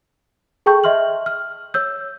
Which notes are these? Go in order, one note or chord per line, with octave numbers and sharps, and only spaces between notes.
G#4 A4 G5 A5 C#6 G6
D#5 E5 C6 F6 F#7
F6
C#5 E6 G6